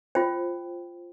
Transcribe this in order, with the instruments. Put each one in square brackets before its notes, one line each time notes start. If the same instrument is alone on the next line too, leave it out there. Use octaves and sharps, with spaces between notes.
[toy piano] F4 C5 G5